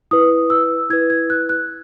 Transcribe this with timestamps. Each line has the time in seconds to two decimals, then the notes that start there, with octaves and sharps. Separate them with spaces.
0.11 E4 B4 D#6
0.50 E6
0.90 E4 B4 G#6
1.10 G#6
1.30 F#6
1.49 F#6